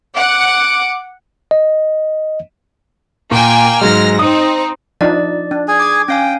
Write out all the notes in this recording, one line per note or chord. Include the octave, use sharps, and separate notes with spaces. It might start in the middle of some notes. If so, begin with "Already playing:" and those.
F#5 D6
D#5
A#2 A#3 G5 G#5
G#2 F#3 G#3 F6 A#6
C4 D#4 D#6
F3 D4 D#4 D5
D4
G#4 G#5
D6 G#6
C#4 F5 G5 G#5